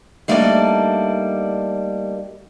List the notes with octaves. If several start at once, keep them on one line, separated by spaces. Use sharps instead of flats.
G3 A3 A#3 D4 D#4 D5